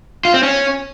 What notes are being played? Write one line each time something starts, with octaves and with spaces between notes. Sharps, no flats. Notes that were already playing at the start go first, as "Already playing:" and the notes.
F4
C4
C#4